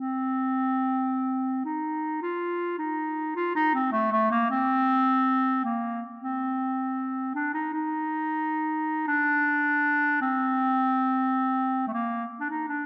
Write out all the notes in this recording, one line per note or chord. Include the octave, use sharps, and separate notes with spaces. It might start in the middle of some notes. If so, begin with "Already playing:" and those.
Already playing: C4
D#4
F4
D#4
F4
D#4
C4
A3
A3
A#3
C4
A#3
C4
D4
D#4
D#4
D4
C4
A3
A#3
D4
D#4
D4